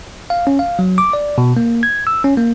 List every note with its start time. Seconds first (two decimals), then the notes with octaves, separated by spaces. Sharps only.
0.30 F5
0.47 C#4
0.59 F5
0.79 F#3
0.98 D6
1.13 D5
1.38 B2
1.57 A#3
1.83 G#6
2.07 E6
2.24 C#4
2.37 A#3